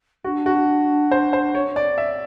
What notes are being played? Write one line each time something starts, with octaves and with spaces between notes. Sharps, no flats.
D4 F#4
F#4
C5
C5
C#5
D5
E5